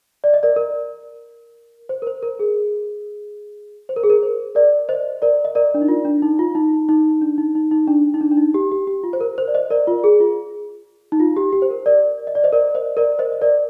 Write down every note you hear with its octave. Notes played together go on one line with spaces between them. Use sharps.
D5
D#5
A#4 D5
A#4
C5
A#4
C5
A#4
G#4
C5
A#4
G#4
A#4
C5
A#4 D5
C5 D#5
A#4 D5
D#5
A#4 D5
D4
D#4
F4
D4
D#4
F4
D#4
D#4
D4
D#4
D#4
D#4
D4
D#4
D4
D4
D#4
G4
G4
G4
F4
C5
A#4
C5
D5
C5 D#5
A#4 D5
F4
G#4
F4
D#4
F4
G4
G4
C5
A#4
A#4 D5
D#5
D5
C5 D#5
A#4 D5
C5 D#5
A#4 D5
C5 D#5
D#5
A#4 D5